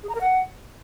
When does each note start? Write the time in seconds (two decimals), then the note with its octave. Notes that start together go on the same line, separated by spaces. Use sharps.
0.03 G#4
0.09 A#5
0.15 A#4
0.21 F#5